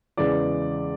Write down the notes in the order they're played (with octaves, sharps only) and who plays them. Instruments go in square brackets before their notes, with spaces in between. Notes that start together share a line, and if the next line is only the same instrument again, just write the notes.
[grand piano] E2 C#3 E3 G#3 D5